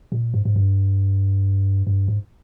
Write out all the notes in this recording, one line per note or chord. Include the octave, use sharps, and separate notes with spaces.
A#2
G#2
G#2
G2
G2
G#2